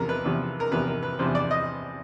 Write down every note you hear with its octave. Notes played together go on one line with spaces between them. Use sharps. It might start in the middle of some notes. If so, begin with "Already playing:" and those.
Already playing: E2 C3 F3 A#4
B4
E2 C3 F3
A#4
E2 C3 F3 B4
A#4
B4
E2 C3 F3 C5
D5
D#5